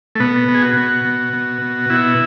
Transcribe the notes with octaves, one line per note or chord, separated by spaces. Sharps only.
A3
B2 B3
B2
G#4
F#4
B2
B2
B2
B2
B2 E4